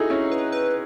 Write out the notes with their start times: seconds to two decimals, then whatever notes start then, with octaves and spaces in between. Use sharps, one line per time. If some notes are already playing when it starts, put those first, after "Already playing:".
Already playing: D#4 E4 F#4 G#4 A4
0.10 C#4 E4
0.32 B4
0.52 B4